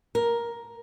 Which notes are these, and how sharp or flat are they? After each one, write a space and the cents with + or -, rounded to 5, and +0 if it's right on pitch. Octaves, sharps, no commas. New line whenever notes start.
A#4 +10